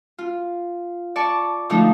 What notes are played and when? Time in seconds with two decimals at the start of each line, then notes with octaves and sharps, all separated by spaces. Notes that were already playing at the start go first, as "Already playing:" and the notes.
0.18 F4
1.16 D5 A5 C#6
1.70 D3 F3 A3 D#4